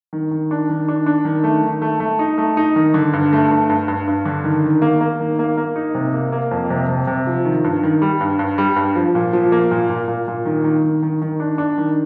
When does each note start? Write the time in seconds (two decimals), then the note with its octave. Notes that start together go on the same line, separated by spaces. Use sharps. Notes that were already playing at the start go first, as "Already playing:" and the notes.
0.13 D#3
0.31 D#3
0.51 D4
0.70 D#3
0.88 D4
1.06 D4
1.25 D#3
1.44 A3
1.63 D#3
1.82 A3
2.00 A3
2.19 D#4
2.38 A3
2.57 D#4
2.76 D#3
2.94 D3
3.13 G2
3.33 A3
3.51 G2
3.69 G2
3.88 G2
4.07 G2
4.25 D3
4.44 D#3
4.64 D#3
4.82 A#3
5.01 A#3
5.20 D#3
5.39 A#3
5.57 A#3
5.76 D#4
5.95 C3
6.14 A#3
6.32 A#3
6.51 F2
6.70 C3
6.88 C3
7.07 C3
7.27 F3
7.45 D#3
7.64 G2
7.83 D#3
8.02 G3
8.21 G2
8.39 G2
8.58 G3
8.76 G2
8.96 F3
9.15 A#2
9.33 F3
9.52 A#3
9.71 A#2
9.90 A#2
10.08 A#2
10.28 A#2
10.45 D#3
10.64 D#3
10.83 D#3
11.02 D#3
11.22 D#3
11.40 D4
11.58 D4
11.78 D#3